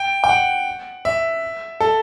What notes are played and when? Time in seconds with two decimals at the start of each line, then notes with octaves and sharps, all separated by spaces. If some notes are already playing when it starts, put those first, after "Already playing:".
Already playing: G5
0.24 G5
0.29 F#5
1.05 E5
1.80 A4